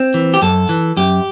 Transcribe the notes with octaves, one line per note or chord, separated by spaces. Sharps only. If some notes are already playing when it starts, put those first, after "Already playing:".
Already playing: C4
E3
G4
F#2 A4
E3
F#2 G4